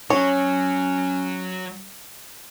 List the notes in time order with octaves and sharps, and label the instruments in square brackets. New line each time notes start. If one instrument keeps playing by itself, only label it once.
[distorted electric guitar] F#3 [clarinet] C#4 [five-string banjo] C#5